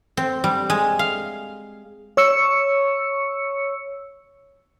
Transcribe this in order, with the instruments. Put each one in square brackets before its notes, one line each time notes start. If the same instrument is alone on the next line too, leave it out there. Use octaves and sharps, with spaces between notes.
[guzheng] C4
G3
G#3
F5
[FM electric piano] C#5 C#6 E6 C#7